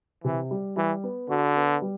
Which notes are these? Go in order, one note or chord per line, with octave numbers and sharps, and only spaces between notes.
C3 E3
G3
E3 G3
B3
D3 F#4
B3
G3